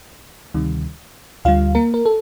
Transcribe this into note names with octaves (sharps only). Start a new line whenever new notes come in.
D2 C3 D#3 G3
D2 D3 G3 F4 F5
A#3 A#4
A#4
A4